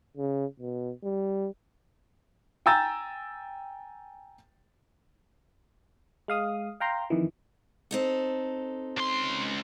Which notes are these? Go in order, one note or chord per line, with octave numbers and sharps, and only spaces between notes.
C#3
B2
G3
G5 G#5 A#5 E6 G6 A6
G#3 F5 D#6
F5 G5 A#5 C6
F2 D#3 E3
C4 D#4 A4
C#2 C6